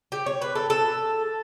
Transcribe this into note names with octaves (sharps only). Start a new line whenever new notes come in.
G4
C#5
B4
A4
A4